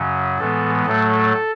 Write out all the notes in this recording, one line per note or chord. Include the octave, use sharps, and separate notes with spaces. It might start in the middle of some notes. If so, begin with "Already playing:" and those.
Already playing: F#2 C#3 F#3
A2 E3 G#3 B3 A4
A2 F#3 A3 A4